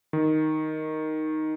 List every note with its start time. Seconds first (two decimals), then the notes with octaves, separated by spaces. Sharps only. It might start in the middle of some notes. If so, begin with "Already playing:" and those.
0.13 D#3